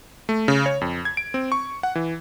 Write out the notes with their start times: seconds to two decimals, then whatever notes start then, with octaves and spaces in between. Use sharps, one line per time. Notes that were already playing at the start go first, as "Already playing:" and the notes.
0.29 A3
0.48 C#3
0.66 C#5
0.81 F2
1.05 G#6
1.17 D7
1.34 C4
1.52 C#6
1.83 F#5
1.95 E3